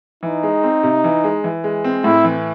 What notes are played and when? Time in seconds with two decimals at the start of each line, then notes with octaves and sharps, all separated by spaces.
0.23 E3 D#4
0.43 G#3
0.64 C4
0.83 C3
1.04 E3
1.24 G#3
1.44 E3
1.64 G#3
1.84 C4
2.04 A2 E4
2.25 E3